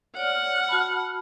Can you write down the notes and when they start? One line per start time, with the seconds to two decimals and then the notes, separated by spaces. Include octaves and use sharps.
0.17 C#5 D5 F#5 F6
0.69 F#4 A5 B5